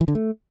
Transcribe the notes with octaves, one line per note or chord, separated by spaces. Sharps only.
E3
D3
A3